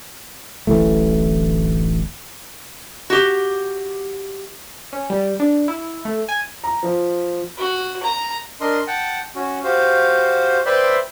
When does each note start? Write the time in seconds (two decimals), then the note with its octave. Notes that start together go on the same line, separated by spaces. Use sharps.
0.67 D1 A1 E3 A3
3.10 F#4 G4
4.93 C#4
5.10 G3
5.40 D4
5.68 E4
6.05 A3
6.28 G#5
6.64 A#5
6.83 F3
7.58 F#4
8.03 A#5
8.61 D4 A#4 D#5 C6
8.87 F#5 G5 A5
9.35 C#4 F#4
9.64 F#4 G4 C5 F5
10.66 B4 C5 D5 E5 G5 C6